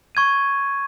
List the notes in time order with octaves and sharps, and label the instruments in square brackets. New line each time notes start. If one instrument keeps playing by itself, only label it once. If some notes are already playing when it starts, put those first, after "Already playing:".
[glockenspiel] C#6 G#6 D#7